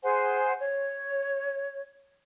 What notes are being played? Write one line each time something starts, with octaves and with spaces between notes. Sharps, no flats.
G#4 C5 F#5 G#5
C#5